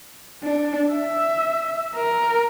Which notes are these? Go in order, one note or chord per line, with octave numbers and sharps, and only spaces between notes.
D4
E5
A#4